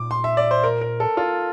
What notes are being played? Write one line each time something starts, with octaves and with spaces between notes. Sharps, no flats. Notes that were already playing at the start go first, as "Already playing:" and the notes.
Already playing: A#2 D6
C6
E5
D5
C5
A#4
A#4
A4
F4